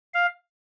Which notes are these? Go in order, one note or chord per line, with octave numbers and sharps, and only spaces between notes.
F5